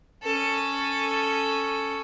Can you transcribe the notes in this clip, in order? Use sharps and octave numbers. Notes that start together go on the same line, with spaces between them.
C#4 A4